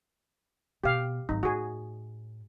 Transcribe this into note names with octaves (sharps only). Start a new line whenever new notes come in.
B2 G4 F5
G#1 F#3 D#4
A2 F#4 G#4